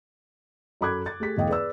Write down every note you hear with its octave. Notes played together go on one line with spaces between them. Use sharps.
F#2 A4 B5 D6 F#6 G#6
A6
A3 G4 G#4 B6
E1 E3 A3 D#5 F5 G5
G#4 B4 D5 E6